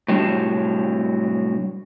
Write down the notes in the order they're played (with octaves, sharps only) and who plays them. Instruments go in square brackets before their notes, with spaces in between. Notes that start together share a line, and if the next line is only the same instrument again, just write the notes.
[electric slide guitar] A2 C3 F#3 G3 D4